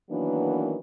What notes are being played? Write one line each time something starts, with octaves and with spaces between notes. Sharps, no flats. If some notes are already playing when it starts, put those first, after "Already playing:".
D#3 E3 F#3 A#3 B3 D4